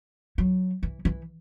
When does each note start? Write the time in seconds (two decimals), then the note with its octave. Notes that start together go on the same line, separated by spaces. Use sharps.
0.38 F#3
0.83 E3
1.05 E3